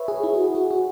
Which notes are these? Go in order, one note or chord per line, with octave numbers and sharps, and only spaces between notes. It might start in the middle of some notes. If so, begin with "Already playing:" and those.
Already playing: B4 C#5 E5
G#4
E4
F#4
G#4
F#4
F#4